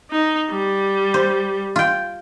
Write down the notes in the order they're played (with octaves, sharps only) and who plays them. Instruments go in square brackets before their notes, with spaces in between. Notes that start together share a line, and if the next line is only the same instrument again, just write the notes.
[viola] D#4
G3
[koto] C5
F4 G5